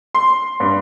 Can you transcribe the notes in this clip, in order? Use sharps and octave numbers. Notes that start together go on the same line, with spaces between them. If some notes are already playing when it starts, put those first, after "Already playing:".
C6
G2